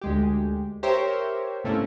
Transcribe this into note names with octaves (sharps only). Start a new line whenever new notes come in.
D2 G#3 G4
G4 A#4 C5 C#5 E5
G#2 C3 A3 A#3 C#4 E4